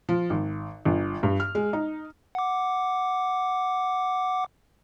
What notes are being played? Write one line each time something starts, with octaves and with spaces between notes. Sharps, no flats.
F3
G#1
G1
G2
F6
G#3
D#4
F#5 D6